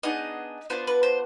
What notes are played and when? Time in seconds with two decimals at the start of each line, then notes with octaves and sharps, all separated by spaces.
0.03 B3 D4 D#4 G#4 D#5
0.70 B3 D4 F4 C5
0.87 B4
1.03 C5